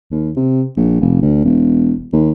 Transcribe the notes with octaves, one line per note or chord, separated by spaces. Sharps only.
D#2
C3
A#1
F1
D2
E1
D#2